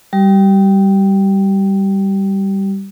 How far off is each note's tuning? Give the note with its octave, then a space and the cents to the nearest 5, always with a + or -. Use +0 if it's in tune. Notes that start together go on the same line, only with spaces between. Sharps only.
G3 +0 G4 -40